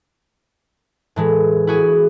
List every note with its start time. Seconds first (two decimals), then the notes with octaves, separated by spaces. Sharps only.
1.16 A2 E3 G#3
1.67 E4 F#4 G#4